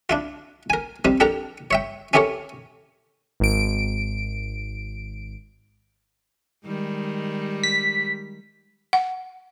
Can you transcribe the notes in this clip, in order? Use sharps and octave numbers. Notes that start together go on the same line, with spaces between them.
D4 E4 F4
A#4 G#5
G3 C4 D#4
D4 G4 A4 A#4 G5 A#5
C#5 E5 G5
C#4 E4 G4 A4 A#4 C#5
G#1 D7
D#3 G3 G#3
B6
F#5